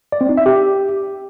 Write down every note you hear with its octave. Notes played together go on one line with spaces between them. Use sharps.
D5
C4
D#4
E5
G4